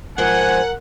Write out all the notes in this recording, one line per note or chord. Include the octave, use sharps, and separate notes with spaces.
G#2 F3 A#4 C5 F#5 G#5